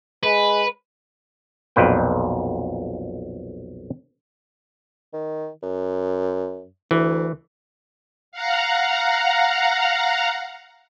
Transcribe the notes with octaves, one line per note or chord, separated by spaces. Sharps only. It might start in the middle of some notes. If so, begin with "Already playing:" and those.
G#3 B4
B1 F2 A#2 B4 G5
D#3
F#2
D2 E3
F5 F#5 A#5